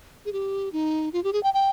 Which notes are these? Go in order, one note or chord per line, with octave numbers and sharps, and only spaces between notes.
G#4
G4
D#4
F4
G4
G#4
G5
G5